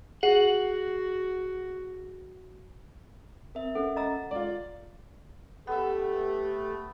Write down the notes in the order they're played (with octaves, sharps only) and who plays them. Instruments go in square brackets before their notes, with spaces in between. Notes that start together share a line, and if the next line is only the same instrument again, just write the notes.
[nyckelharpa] F#4 [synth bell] G#4 [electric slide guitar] F#5
[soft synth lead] C4 [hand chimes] A#4 E5
[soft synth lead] C#4 [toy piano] A4 [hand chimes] F#5
[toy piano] D#5 A#5 E6
[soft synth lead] G#3 [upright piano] F4 D5
[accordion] A3 [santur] B3 E5 [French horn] G4